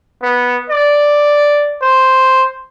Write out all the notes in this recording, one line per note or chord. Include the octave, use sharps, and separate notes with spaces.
B3
D5
C5